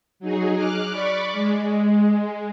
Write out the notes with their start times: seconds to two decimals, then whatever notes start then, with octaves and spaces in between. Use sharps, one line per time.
0.20 F#3 D#4 G#4
0.55 D6 F6 F#6
0.91 D5 B5 C#6 D6
1.32 G#3